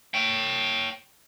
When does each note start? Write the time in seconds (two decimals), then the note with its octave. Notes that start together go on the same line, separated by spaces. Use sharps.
0.14 C#5 G5